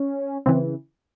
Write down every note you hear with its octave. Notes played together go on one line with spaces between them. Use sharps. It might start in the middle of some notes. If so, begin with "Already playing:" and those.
Already playing: C#4
C#3 E3 C4